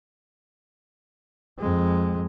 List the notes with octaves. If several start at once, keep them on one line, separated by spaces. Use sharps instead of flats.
F2 G#3